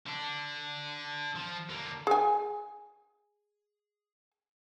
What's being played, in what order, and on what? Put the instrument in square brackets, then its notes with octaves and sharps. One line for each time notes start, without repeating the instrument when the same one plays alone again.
[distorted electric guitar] D3 D4
F3
D3 A#3
[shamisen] G#4 G#5